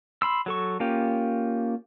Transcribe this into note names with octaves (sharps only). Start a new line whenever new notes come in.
B5 C6 E6
F#3 A4 C#6
A#3 C#4 F4 G4